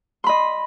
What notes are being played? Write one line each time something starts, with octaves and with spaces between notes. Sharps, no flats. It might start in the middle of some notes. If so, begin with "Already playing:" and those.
D#5 B5 C6